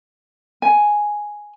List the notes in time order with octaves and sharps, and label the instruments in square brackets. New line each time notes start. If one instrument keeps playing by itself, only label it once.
[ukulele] G#5